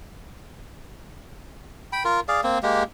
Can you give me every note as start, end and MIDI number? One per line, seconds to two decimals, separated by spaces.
1.93 2.03 79
1.93 2.03 83
2.05 2.20 65
2.05 2.20 70
2.28 2.41 68
2.28 2.41 74
2.28 2.41 77
2.43 2.59 58
2.43 2.59 60
2.63 2.83 56
2.63 2.83 58
2.63 2.83 67